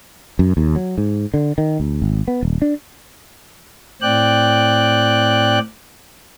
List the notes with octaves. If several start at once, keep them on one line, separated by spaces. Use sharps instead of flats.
F#2
D#2
F#3
G#2
D3
D#3
D2
G#1
B3
D#1
D4
A2 C4 D5 G5 F#6